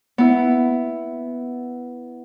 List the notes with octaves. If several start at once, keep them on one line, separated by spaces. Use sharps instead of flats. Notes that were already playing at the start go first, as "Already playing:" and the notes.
B3 E4